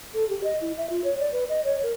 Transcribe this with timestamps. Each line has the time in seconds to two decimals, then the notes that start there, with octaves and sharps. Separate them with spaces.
0.14 A4
0.29 G4
0.44 D#5
0.61 E4
0.77 E5
0.90 F4
1.04 C#5
1.20 D5
1.32 B4
1.49 D#5
1.64 C#5
1.83 A#4